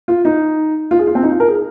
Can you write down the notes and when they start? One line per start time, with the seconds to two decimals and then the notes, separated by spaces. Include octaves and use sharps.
0.08 F4
0.25 D#4
0.91 F4
0.99 G#4
1.07 F4
1.15 C4
1.23 D#4
1.32 F4
1.40 A#4
1.48 G#4